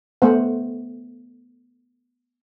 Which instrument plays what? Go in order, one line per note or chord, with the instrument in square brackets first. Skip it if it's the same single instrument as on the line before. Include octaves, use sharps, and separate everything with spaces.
[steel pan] A3 B3 C5 F#5